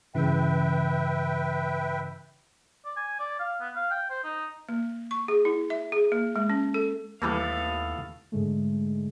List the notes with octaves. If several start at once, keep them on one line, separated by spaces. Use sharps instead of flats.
G2 C#3 E3 B4 E5 G5
D5
G#5
D5
F5
B3
F5
G5
C5
D#4
A#3
C#6
G#4
E4
E5
G#4
A#3
G#3
C#4
A4
D#2 A2 E3 G3 A#3 B3 A4 F5
G#2 D3 G#3 A3